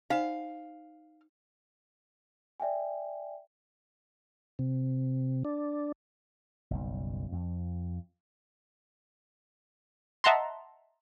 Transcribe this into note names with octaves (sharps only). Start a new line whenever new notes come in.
D#4 C5 F5 G#5
D5 E5 G5 G#5
C3
D4
F#1 B1 G3
F2
D#5 E5 F#5 A5 A#5 C6